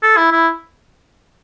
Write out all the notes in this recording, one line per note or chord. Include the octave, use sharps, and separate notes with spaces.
A4
E4
E4